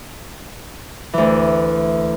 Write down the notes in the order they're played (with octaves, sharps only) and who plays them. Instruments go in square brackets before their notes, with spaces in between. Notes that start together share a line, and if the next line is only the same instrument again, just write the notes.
[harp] D2 E3